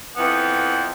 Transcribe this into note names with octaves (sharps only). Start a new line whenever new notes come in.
F2 E3 B3